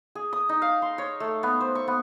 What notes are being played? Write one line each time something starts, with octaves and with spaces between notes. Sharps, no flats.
G#4
D#6
D#4
F5
C6
C#5
A3
B3
C5
C#6
B3